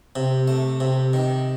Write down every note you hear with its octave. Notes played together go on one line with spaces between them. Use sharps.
C3
A3
C3
D#3